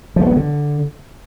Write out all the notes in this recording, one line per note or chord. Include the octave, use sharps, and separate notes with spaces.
F3
A3
B3
F#3
D3